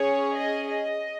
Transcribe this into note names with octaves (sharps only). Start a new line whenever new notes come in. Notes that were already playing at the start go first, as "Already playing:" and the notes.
Already playing: C#4 G#4 C#5
D#5
D#5